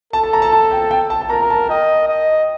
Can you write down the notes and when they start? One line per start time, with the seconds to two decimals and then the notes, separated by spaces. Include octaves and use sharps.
0.13 A4 A5
0.24 A5
0.33 A#5
0.42 A5
0.52 A5
0.71 G5
0.91 G5
1.10 A5
1.21 A5
1.30 A#4 A#5
1.42 A#5
1.50 A5
1.69 D#5 G5
2.08 D#5